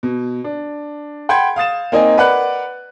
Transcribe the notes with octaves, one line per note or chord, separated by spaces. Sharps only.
B2
D4
F#5 G5 B5 C6 G6 G#6
F5 D#6 A6 E7
A#3 C4 D#4 D#5 G#5
A#4 B4 D5 F#5 B5 F#6